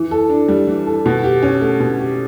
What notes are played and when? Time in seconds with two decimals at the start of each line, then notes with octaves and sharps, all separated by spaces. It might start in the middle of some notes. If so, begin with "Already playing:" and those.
Already playing: E3
0.11 A4
0.29 D4
0.48 G3
0.67 E3
0.86 A4
1.06 B2
1.24 G4
1.43 C#4
1.61 A3
1.80 B2
1.99 G4